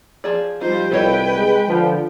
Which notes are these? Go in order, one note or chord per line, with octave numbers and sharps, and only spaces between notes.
F3 G#4 D5
F3 G3 D#4 F4 C5
C2 A4 B4 C#5 D#5 G5
G#3
D3 F3